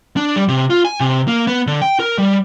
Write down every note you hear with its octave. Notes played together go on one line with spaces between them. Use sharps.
D4
G3
C3
F4
G#5
C3
A#3
B3
D3
G5
A#4
G3